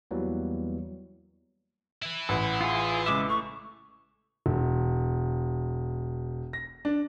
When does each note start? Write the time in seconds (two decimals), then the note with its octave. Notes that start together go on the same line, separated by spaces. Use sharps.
0.11 E2 E3 F#3 G3 A#3 B3
2.02 E4 B4
2.29 A1 F#5
2.61 F4 G#4
3.06 C#3 G#3 E5 D6
3.29 A3 C#6
4.46 E1
6.53 A#6
6.85 D4